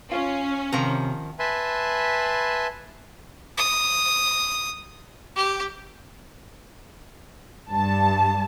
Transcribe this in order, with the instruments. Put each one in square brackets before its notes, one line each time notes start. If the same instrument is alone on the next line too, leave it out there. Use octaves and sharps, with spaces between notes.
[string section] C#4 [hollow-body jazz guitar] F4
[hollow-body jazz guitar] C3 [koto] D#3 F3 A#5
[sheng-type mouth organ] B4 E5 G#5 A5 B5 C6
[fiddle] D#6
G4
[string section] G2 A5